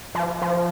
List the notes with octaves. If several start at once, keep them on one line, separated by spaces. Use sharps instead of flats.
F3
F3